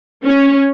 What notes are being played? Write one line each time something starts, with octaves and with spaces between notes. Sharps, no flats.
C#4